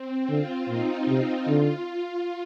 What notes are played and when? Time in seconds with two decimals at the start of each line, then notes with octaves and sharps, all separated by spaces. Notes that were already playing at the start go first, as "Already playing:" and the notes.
Already playing: C4
0.29 D3 F4
0.68 A#2 D#4
1.07 C3 D#4
1.47 D3 F4